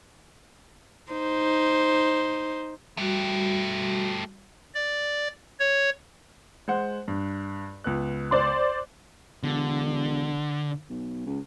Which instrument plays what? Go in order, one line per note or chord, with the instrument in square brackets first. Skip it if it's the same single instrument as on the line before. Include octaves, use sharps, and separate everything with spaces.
[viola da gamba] D#4 C5
[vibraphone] G3 F#4 [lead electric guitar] A3 G4
[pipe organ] D5
C#5
[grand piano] G#3 C5 F#5
G2
C#2 B3 F#6
[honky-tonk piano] C5 D5 C6
[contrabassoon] E1 [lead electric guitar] D3
[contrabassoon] B1
C#2